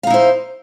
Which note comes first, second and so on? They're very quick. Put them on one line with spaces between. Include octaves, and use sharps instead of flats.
F5 D#4 E4 C5